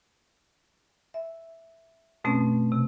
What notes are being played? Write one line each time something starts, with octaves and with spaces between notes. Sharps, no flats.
E5
F#2 B2 A3 C4 C#4
C3